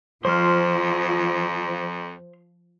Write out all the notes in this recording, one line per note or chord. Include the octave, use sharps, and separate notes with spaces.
F2 F3 C5 C6 F6